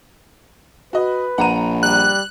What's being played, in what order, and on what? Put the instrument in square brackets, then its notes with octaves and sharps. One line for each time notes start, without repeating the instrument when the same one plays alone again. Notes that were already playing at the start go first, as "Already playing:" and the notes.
[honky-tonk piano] F#4 D#5 [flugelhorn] B4
[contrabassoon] A#1 [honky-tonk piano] F#5 A#5 D#7
[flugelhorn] G3 [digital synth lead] F#6